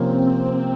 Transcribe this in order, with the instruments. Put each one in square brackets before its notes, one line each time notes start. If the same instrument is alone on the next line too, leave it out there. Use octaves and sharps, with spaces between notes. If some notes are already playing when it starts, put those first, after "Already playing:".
Already playing: [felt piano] C3 F3 A#3 C#4 [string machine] C4